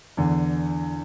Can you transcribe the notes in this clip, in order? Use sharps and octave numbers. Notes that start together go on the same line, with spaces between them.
E2 D3